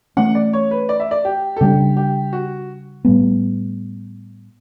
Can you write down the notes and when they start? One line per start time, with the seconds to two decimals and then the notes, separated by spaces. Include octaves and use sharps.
0.17 E3 A3 C#4 F#5
0.35 D5
0.53 C#5
0.71 B4
0.89 D5
1.00 E5
1.11 D5
1.25 G4
1.57 A4
1.61 C#3 G3 B3 D4 G4
1.97 G4
2.33 F#4
3.05 A2 G3 B3